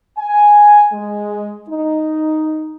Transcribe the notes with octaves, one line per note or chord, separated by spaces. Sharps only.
G#5
G#3
D#4